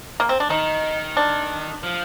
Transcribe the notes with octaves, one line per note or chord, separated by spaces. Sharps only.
A#3
C4
D4
D#3 D#4
D4
F3